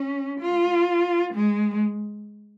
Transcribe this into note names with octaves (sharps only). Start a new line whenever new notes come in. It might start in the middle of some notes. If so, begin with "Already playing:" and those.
Already playing: C#4
F4
G#3